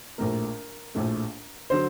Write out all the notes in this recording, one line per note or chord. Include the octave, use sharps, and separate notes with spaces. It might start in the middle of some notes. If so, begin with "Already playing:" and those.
A#1 A2 A3 A#4
A#1 A2 A3
D3 F#3 C5